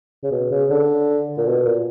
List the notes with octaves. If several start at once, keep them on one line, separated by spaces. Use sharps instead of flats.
C#3
B2
C#3
D3
A#2
B2
A#2